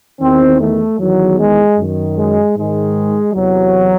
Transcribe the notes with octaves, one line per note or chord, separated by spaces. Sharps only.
E2 D#3 C4
A3
E2 D#3 F#3
G#3
F#2
D#3
G#3
G#2 D#3 G#3
E2 C3 E3 F#3